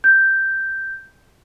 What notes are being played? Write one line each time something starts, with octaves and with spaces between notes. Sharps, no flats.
G6